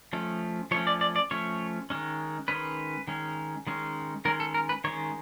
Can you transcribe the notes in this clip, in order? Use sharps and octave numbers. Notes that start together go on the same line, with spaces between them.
F3 A3 C#4
F3 A3 C#4 C#5
D5
D5
D5
F3 A3 C#4 C#5
D#3 G#3 C#4
D#3 G#3 C#4 B4
D#3 G#3 C#4
D#3 G#3 C#4
D#3 G#3 C#4 A#4
A4
A#4
B4
D#3 G#3 C#4 C#5